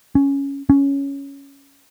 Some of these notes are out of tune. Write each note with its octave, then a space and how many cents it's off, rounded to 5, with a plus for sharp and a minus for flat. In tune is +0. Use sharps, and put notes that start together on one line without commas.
C#4 +5
C#4 +5